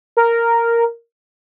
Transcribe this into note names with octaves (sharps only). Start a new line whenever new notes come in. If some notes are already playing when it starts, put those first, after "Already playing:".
A#4